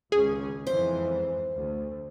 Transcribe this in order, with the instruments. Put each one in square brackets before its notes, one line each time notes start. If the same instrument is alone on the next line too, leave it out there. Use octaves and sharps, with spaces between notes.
[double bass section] G#1 C#2 C#4 [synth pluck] G#4
[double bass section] F2 G#2 E3 [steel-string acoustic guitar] C5
[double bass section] D2